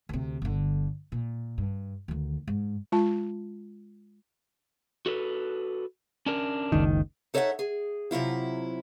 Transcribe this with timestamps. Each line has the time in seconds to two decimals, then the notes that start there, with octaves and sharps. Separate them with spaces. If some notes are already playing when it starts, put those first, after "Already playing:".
0.09 D2 C3
0.42 G1 D3
1.12 A#2
1.58 G2
2.08 D2 D#3
2.47 G#2
2.92 G#3 F4 A5
5.06 F#4 A4 B4
6.26 C#4 D4 A#4
6.72 F#1 C#2 D#3
7.34 D#4 A4 C#5 D5 E5 F#5
7.59 G#4
8.11 C3 F#3 E4 F4